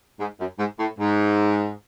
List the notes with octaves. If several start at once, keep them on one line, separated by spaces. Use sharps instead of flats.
G#2
F#2
G#2
A2
G#2